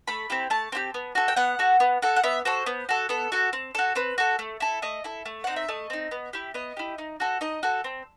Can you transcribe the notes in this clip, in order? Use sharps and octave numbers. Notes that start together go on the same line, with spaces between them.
A3 B5
C4 E4 G4
A3 A5
C4 E4 G4
B3
F#4 A4
G5
B3 F#5
F#4 A4
B3
F#4 A4
F#5
B3 E5
F#4 A4 C5
B3
F#4 A4
B3 A4
F#4 A4
C4
F#4 A4
C4 B4
F#4 A4
A3
E4 A4
A3 D#5
E4 A4
A3
C4 D#4 F#5
E5
A3 D#5
C4 D#4
B3
E4 G4
B3 D#5
E4 G4
D#4
F#4 A4
D#4 D#5
F#4 A4
C4